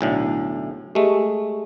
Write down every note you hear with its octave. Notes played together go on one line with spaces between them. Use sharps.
B1 A2 D3
G#3 A3 G4